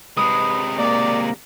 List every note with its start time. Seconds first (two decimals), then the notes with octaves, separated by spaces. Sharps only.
0.17 C3 G#3 B4 D#6
0.79 A#3 D5